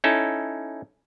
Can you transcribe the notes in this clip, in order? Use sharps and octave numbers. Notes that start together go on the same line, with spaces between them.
C#4 D#4 E4 A4